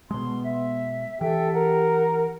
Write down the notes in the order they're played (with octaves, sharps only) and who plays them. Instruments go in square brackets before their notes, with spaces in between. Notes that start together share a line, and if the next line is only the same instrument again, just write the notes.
[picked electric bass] B2 G#3 [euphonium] B3 [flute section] C6
[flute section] E5
[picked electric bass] E3 [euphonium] G4 [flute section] A4 E5 G5
[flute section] A#4 F#5